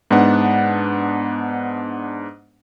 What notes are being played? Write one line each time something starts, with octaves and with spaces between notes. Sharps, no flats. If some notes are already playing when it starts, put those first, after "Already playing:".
G#2 B3 D4 F#5